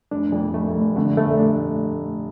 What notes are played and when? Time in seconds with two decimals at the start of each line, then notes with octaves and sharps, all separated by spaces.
0.11 F1 D4
0.32 F2
0.54 F1 A3
0.75 F1
0.96 D3 A3
1.17 F1 A3
1.39 D4